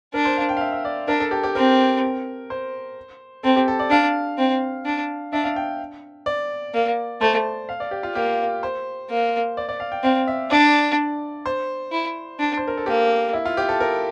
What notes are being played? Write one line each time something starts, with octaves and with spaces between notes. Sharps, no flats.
D4 A#4
C5
F5
G5
F5
E5
E5
D5
D4 A#4
A4
G4
G4
C4 A#4
C5
C4 A4
G4
A4
D5
D4 F5
C4
D4
D4 E5
F5
G5
D5
A#3
A3 C5
F5
D5
G4
F4
A#3 G4
C5
A#3
D5
D5
F5
G5
C4 F5
E5
D4 D5
C5
E4
D4
C5
A#4
A4
A#3 G4
E4
F4
G4
A4
A#4